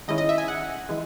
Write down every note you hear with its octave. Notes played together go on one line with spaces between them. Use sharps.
D#3 G#3 C#4 E4 D#5
D#5
E5
G#5
F#5
E3 G#3